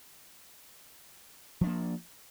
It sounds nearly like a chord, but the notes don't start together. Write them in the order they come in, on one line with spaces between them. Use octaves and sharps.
F3 D4 A#3